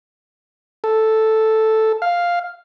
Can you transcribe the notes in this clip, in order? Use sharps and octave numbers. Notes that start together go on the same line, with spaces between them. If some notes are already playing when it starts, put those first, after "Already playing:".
A4
F5